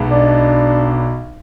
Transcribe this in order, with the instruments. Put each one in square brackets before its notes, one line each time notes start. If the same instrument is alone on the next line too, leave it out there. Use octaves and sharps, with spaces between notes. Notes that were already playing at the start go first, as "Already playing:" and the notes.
Already playing: [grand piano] B1 B2 G#3 B3
[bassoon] D4